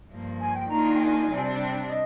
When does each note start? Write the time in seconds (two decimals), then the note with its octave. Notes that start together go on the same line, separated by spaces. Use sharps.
0.10 G2 F3 A#3
0.40 G#5
0.54 G5
0.69 D#3 A#3 D4 F4 G#4 A#5
0.94 G5
1.00 G#5
1.30 C3 G3 D4
1.59 G5
1.82 D5
1.90 D#5